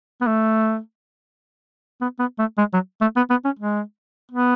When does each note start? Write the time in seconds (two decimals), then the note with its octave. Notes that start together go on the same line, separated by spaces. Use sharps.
0.21 B3
0.27 A3
2.01 B3
2.20 B3
2.39 A3
2.58 G#3
2.74 F#3
3.01 A3
3.16 B3
3.30 B3
3.45 C#4
3.59 G#3
4.31 B3